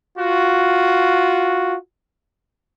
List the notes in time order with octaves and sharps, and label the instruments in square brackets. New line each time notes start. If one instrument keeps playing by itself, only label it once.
[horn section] F4 F#4